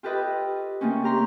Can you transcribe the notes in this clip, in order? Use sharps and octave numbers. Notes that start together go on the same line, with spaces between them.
F4 G4 A4 B4 D#5
C#3 A3 A#3 C4 C#4
G4 A#5 C6